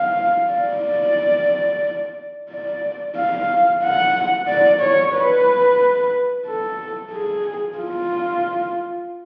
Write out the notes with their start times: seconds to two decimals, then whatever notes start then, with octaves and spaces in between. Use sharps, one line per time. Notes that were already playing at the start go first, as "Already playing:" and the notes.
Already playing: F5
0.53 D5
2.50 D5
3.16 F5
3.83 F#5
4.48 D5
4.81 C#5
5.15 B4
6.46 A4
7.12 G#4
7.78 F4